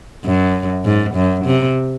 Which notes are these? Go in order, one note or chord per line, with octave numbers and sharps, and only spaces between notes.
F#2
G#2
F#2
C3